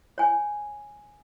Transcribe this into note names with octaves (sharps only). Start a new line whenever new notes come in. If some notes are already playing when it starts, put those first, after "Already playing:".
C#5 G#5